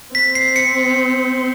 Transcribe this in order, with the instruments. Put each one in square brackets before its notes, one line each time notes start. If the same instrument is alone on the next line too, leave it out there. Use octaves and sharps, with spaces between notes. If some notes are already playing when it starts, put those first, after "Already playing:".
[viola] C4 [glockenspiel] B6
[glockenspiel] C7
C#7